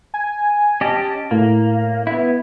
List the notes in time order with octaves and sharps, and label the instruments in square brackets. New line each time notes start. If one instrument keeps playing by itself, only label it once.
[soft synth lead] G#5
[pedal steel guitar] C#4 G4 D#5 [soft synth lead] A5
[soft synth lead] A2 [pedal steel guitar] A#3
[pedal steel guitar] B3 E4